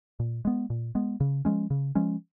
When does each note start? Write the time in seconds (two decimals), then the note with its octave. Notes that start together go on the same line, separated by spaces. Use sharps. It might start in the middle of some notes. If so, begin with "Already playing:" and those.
0.20 A#2
0.45 G#3 B3
0.70 A#2
0.95 G#3 B3
1.20 C#3
1.45 F3 G#3 C#4
1.70 C#3
1.95 F3 G#3 C#4